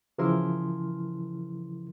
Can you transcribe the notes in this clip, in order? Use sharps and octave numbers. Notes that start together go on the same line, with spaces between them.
C#3 E3 F3 E4 A#4 C6